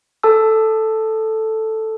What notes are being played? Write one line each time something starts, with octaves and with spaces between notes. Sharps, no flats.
A4 A5 E6